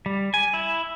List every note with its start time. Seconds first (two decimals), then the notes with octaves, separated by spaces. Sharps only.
0.06 G3
0.34 G#5
0.54 E4